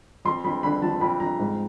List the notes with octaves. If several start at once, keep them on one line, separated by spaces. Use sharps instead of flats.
F2 C6
F2 B5
D3 B5
F3 A5
F2 B5
F2 A#5
G#2